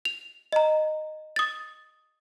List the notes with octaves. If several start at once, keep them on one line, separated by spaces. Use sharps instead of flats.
F7
D#5 A#5
D#6 A6